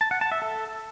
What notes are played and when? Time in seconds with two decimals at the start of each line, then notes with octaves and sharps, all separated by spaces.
0.01 A5
0.11 F#5
0.21 A5
0.32 E5
0.42 A4